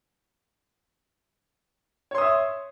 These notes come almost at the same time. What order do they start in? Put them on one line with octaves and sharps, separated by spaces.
C#5 C6 D#6 E5